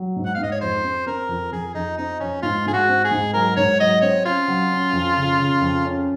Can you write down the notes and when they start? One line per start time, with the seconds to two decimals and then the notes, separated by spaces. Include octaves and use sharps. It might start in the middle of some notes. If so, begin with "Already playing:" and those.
Already playing: F#3
0.16 G#2
0.26 F#5
0.35 G#2 F5
0.43 D#5
0.52 C#5
0.61 F2 C5
0.84 C4
1.07 C4 A#4
1.29 F2
1.52 F2 G#4
1.75 F2 D#4
1.98 C4 D#4
2.20 F2 C#4
2.43 G#2 F4
2.66 G#2 G#4
2.73 F#4
2.89 C4
3.04 G#4
3.11 G#2
3.34 F#3 A#4
3.57 G#2 C#5
3.80 F#3 D#5
4.02 C4 C#5
4.25 C#4 F4
4.48 F#3
4.71 C#4
4.93 F2
5.17 C#3
5.39 C#3
5.61 F2
5.85 C#4